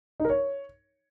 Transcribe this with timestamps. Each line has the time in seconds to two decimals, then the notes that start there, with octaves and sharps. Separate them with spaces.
0.20 D#4
0.25 A#4
0.30 C#5